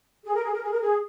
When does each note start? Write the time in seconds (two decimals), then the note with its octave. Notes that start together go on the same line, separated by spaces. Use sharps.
0.25 G#4
0.34 A#4
0.43 G#4
0.53 A#4
0.62 G#4
0.71 A#4
0.80 G#4